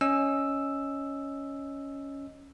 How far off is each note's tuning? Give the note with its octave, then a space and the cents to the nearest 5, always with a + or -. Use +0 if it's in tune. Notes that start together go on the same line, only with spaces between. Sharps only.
C#4 +0 D#5 +0 E6 +0